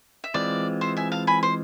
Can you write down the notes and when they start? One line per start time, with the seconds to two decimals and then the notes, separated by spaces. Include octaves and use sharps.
0.24 E5
0.34 E3 G#3 C4 F4 D5
0.81 C5 E5
0.97 E5 G#5
1.12 F5 A5
1.27 G#5 B5
1.43 C5